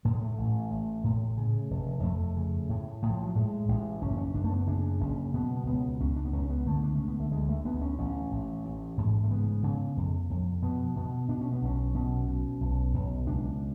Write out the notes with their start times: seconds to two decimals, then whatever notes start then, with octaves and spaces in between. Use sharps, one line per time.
0.05 A2 A3
0.13 G#3
0.21 A3
0.38 A1
0.71 A1
1.04 A2
1.37 C#3
1.71 F1
2.03 F2 A3
2.36 C#3
2.69 A2
3.02 A2
3.10 F3
3.23 F#3
3.35 A2 G#3
3.69 A1
4.02 F#1 C#4
4.18 C#4
4.34 F#1 D4
4.44 A3
4.51 B3
4.68 C#3 D4
5.01 F#1 C#4
5.34 B2 B3
5.66 C#2 B3
6.00 C#2 C#4
6.16 D4
6.25 B3
6.33 C#2 C#4
6.50 B3
6.66 D3 A3
6.83 D4
6.96 D3 C#4
7.08 B3
7.20 A3
7.32 D2 G#3
7.49 A3
7.65 D2 B3
7.82 C#4
7.98 A1 C#4
8.31 A1
8.64 A1
8.98 G#2
9.24 A3
9.30 C#3 B3
9.63 C#3
9.97 F2
10.30 F2
10.62 B2 B3
10.96 B2
11.28 B2 D4
11.41 C#4
11.53 B3
11.62 B1 C#4
11.95 B2 C#4
12.28 B2
12.61 B1
12.94 B1
13.27 C#2 D4